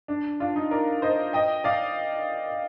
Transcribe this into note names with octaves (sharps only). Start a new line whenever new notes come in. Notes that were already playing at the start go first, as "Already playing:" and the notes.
D4
D4 F4
D#4
A#4 D5
C5 D#5
D#5 G5
D5 F5